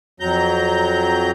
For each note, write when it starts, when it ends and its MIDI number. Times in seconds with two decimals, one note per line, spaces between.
0.20 1.31 41
0.20 1.31 54
0.20 1.31 82
0.20 1.31 91